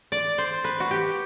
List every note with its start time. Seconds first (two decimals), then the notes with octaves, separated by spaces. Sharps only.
0.12 D5
0.38 C5
0.64 B4
0.80 F#4
0.91 G4